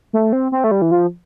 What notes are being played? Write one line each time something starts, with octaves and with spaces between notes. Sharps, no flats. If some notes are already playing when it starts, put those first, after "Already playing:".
A3
C4
C4
A3
G3
E3
F3